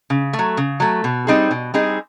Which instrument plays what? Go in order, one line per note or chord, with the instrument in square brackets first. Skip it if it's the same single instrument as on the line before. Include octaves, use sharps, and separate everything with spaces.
[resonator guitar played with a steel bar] C#3
A3
F#3
C#3
F#3 A3
B2
G3 C4 D#4 G#4
B2
G3 C4 D#4 G#4